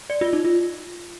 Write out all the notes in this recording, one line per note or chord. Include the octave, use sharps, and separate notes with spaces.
D5
F4
D#4
F4